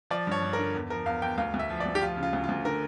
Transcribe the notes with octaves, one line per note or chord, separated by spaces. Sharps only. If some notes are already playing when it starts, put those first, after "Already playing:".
F3 D5
G2 C#5
G2
A#4
D3
E2
F3 A#4
E2 F5
E2 G5
D2 F5
D2
E5
F3
D5
D2
G4
F3 F4
C#3
F4
D2
F4
D2
D3 A#4